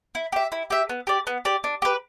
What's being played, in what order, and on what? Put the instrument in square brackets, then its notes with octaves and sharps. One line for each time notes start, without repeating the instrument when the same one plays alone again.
[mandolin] E4
G4 E5
E4
G4 E5
B3
G4 D5
B3
G4 D5
D4
G4 B4